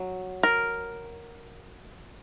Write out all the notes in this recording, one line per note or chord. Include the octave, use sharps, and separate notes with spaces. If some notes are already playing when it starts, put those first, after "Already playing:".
Already playing: F#3
A#4